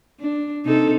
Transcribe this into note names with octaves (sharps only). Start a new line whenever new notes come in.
D4
C3 D#4 A4